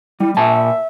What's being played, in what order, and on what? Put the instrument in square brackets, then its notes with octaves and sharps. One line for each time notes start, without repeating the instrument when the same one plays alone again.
[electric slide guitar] G3 [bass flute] E4
[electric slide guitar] A#2 A5 [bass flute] E5